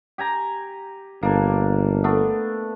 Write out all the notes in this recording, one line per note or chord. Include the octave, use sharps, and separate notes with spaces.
G4 G#5 A#5
G1 A#3 D4
A3 B3 D4